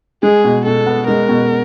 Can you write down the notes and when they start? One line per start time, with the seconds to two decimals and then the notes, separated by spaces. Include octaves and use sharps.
0.23 G#3 G#4
0.44 B2
0.66 B2 A4
0.87 B3
1.08 G#3 A#4
1.29 B2